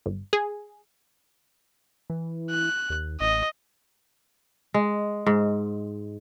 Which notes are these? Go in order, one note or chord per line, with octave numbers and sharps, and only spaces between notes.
G1
G#4
E3
F#6
D#2
A1 D#5
G#3
G#2